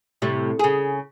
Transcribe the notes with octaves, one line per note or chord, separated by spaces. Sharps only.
A2 C3 G3
C#3 G#4